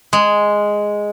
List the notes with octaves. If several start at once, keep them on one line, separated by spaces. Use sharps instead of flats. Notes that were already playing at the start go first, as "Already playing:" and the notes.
G#3